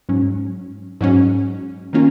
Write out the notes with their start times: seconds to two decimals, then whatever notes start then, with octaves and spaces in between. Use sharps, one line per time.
0.09 G#2 F#3 C#4
1.01 G#2 F#3 C#4
1.93 D#3 A#3 C#4 F4